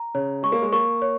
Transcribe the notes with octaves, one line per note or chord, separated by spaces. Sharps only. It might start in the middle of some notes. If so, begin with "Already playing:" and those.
Already playing: A#5
C#3 C#5
G#3 C#6
A#3
G#3
A#3 C#6
C#5